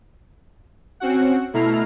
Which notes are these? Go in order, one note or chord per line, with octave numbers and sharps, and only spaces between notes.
C4 C#4 F#4 F#5
B2 A3 E4 A#5 F6 C7